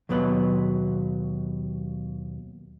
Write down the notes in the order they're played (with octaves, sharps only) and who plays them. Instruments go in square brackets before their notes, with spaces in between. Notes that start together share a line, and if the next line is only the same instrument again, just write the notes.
[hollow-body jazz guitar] D#2 B2 F#3 B3 B4